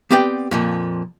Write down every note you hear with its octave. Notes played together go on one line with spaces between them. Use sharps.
B3 C4 G4 B4 D5 G5
F2 A#2 F3